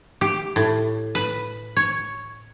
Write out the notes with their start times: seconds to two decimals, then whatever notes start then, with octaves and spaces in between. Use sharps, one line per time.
0.21 G4
0.56 A2
1.15 B4
1.76 C#5